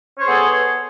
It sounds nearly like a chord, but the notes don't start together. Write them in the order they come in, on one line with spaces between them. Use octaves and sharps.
C#5 C5 G#4 B3 A4